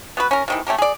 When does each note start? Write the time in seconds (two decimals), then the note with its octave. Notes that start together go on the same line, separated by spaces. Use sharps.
0.17 B3 F#4 B4
0.31 C#4 A#4
0.48 C3 D#3 E3
0.67 A3 C#4 G4 A#4
0.78 G#4 D5